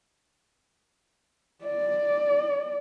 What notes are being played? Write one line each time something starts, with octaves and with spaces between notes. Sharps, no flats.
D5